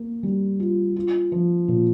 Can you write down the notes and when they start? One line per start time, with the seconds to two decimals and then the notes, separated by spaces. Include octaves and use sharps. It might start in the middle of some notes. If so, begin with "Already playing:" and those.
Already playing: A#3
0.23 G3
0.60 F4
0.96 F4
1.32 F3
1.68 A#2